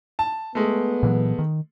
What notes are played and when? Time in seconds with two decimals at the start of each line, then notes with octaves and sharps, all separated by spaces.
0.19 A5
0.55 G#3 A3 B3
1.03 A#2 E3 F#3
1.39 D#3